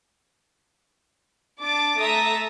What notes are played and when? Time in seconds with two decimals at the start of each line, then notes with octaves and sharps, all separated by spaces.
1.59 D4 D6 A6
1.98 A3 E5 A#5 D#6 A6 B6